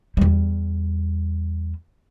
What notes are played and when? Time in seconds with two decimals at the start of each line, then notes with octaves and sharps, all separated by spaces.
0.17 E2 G3